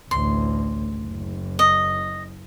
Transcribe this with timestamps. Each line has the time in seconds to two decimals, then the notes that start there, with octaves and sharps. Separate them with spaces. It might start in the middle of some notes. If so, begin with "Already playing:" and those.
0.11 A1 D2 C6
0.97 F#1
1.59 D#5